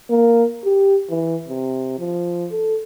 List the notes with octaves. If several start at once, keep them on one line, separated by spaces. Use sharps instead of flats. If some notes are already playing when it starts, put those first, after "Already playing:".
A#3
G4
E3
C3
F3
A4